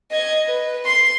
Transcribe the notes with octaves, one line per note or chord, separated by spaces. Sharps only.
D#5 G#6
B4
C6